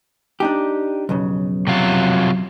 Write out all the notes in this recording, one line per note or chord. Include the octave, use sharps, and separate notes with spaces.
D4 D#4 G4
B1 F2 C#3
C3 F#3 F4